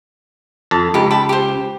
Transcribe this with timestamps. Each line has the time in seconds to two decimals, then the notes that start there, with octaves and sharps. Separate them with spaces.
0.71 F2 A5
0.94 C#2 D#4 G4
1.10 G5 A5 B5
1.29 G4 C5